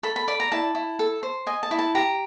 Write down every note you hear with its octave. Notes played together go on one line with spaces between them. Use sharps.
A4 B5
B5
D5 B5
A#5
E4 A5
E4
A4
C5
D#5 G#5
A5
E4
A5
G4 A#5